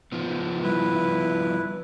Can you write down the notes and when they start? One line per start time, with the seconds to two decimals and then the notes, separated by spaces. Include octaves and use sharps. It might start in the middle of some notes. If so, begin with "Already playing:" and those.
0.12 D#3 F3 B3
0.63 G3 E4 B4